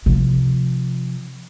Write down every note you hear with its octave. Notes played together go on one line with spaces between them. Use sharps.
C3 F3